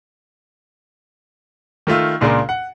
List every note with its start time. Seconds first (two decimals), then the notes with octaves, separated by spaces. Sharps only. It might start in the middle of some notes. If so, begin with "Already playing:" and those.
1.87 D#3 A3 F4 E6
2.20 C#2 A#2 D4 G#4 A#4 C6
2.49 F#5